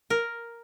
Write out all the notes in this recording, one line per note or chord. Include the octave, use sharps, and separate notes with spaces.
A#4